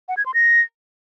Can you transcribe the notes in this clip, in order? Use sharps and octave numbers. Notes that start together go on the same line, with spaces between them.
F#5
G#6
C6
A#6